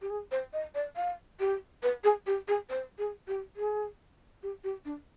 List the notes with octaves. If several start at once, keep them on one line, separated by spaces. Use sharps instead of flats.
G4
G#4
C5
D#5
D5
F5
G4
B4
G#4
G4
G#4
C5
G#4
G4
G#4
G4
G4
D4